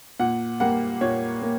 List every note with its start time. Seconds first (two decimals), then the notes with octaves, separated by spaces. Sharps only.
0.20 A#2 F#5
0.60 G3 A#3 F#5
1.01 A#2 C#5
1.42 A#3